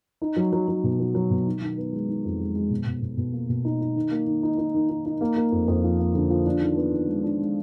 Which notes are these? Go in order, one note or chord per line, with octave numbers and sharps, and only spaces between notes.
D#4
F#3
F#3
F#3
B2
F#3
F#3
B2
D#3
D#3
B3
G#3
D#3
F2
G#3
G#3
B2
B2
B2
B2
A#3
B2
D#4
D#4
D#3
A#3
D#3
D#4
D#4
D#3
D#4
D#4
A#3
A#3
F2
F2
F3
A#3
D3
F3
D4
D#3
B3
D#3
G#3
D4
G#3